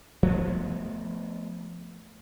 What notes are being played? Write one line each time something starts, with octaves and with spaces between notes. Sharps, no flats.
F3 A3 B3